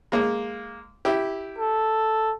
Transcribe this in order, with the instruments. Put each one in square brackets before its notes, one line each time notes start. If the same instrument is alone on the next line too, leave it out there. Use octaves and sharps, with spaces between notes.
[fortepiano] G#3 A#3
E4 G4
[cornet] A4